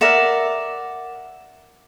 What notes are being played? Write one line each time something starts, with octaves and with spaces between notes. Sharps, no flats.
A#4 D5 E5 F#5